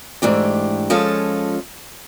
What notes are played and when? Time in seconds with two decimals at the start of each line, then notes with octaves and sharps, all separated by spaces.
0.22 G#2 E3 A3 D4 G4
0.90 F3 G#3 C#4 F4 A4